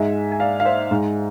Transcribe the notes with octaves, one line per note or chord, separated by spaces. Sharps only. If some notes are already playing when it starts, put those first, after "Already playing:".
Already playing: G#2 G#3 E5 G#5
G#5
D5 F5
F5
C5 E5
G#2 G#3